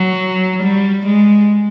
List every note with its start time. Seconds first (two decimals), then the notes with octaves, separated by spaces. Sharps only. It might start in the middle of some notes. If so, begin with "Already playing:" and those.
Already playing: F#3
0.63 G3
1.06 G#3